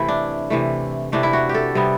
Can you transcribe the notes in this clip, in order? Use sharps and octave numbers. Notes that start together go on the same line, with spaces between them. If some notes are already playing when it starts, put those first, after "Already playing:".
Already playing: C3 E3 A3 E4
D4
C3 E3 A3
C3 E3 A3 D4
E4
F#4
G4
A4
C3 G3 B3